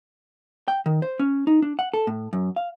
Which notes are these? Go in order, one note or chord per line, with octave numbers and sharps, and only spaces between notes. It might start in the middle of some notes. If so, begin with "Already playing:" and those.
G5
D#3
C5
C#4
D#4
D4
F#5
A4
A2
F#2
F5